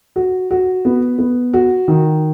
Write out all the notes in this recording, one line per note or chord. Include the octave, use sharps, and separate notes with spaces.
F#4
F#4
B3
B3
F#4
D#3